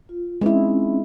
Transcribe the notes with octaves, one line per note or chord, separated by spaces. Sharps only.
F4
G#3 C4 C#4 D#4 E4